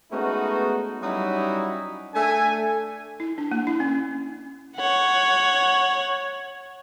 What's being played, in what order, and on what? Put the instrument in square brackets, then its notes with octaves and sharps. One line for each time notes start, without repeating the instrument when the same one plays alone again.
[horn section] G#3 A3 B3 C#4 D#4 F#4
F#3 G3 C#4 D#4 E4 F#4
A3 D4 A4 E5 G#5
[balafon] E4
D4
A#3
E4
C#4
[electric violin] C#5 F#5